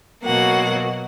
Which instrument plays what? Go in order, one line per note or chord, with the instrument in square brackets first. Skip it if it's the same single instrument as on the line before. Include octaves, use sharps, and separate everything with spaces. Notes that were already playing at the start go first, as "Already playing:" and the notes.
[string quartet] B2 F#3 A#3 F#5